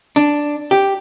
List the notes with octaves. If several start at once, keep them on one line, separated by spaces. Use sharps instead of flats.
D4
G4